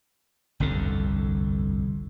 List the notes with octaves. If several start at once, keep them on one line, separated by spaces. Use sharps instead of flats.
G1 C2 F2 D3